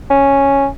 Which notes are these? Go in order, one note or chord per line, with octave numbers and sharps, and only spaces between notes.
C#4